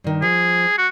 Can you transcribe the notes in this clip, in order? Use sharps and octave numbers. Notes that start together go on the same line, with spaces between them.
G2 D#3
F3 G#4
F#4